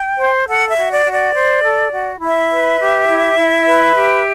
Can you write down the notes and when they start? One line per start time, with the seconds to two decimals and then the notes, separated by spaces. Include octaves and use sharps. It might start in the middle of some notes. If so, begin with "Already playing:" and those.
Already playing: G5
0.17 C5
0.47 A4 F#5
0.68 E5
0.76 F#4
0.90 D5
1.05 F#4
1.12 D5
1.34 C5
1.63 A4
1.92 F#4
2.20 E4 E5
2.50 B4
2.79 G4
3.08 E4
3.37 E4
3.66 B4
3.95 G4